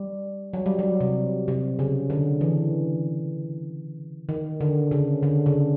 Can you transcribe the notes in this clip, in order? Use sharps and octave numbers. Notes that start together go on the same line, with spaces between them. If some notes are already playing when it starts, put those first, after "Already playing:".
Already playing: G3
F#3
G3
F#3
C3
C3
C#3
D3
E3
D#3
D3
C#3
D3
C#3